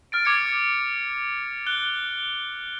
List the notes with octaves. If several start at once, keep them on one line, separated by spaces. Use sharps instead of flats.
F6 A6 D7
D6 G#6 C#7 D7
F#6 G7